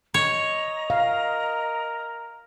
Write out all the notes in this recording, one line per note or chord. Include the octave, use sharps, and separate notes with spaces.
C#5 D#5 A#5
A#4 F5